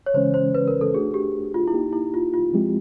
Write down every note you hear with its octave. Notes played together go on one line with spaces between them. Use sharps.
C#5
C#3 E3 G#3 C#4 C5
C5
B4
A#4
A4
A3 D4 F#4 G#4
G4
F4
E4
A#3 D#4 G4
E4
F4
F4
F3 G#3 C4 E4 G4